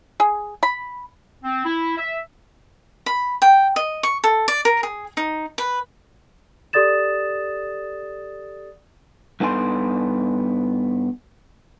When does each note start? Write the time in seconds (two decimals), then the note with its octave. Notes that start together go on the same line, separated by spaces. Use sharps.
0.20 G#4
0.63 B5
1.44 C4
1.66 E4
1.98 E5
3.06 B5
3.42 G5
3.76 D#5
4.03 C#6
4.24 A4
4.48 D5
4.65 A#4
4.83 G#4
5.17 D#4
5.58 B4
6.73 G4 A4 D5 D#6 A6 E7
9.40 G2 B3 D#4 A4 G#5 C6